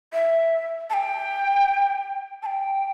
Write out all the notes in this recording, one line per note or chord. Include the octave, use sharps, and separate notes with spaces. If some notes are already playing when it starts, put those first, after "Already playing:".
E5
A5
G5
A5
G5